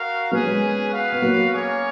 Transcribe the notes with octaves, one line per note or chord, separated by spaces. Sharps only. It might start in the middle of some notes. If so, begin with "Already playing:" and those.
Already playing: F#4 A#4 F5
F#3 A#3 C#4 G#4 B4
G#3 B3
F#4 B4 F5
B3
F#3 A#3
A#3 C#4 G#4 C#5